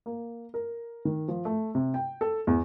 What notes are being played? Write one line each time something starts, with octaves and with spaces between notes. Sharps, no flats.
A#3
A#4
D#3
F3
A3
C3
G5
A4
E2